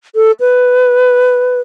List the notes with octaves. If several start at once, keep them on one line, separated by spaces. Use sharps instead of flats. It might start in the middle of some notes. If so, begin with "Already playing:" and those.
A4
B4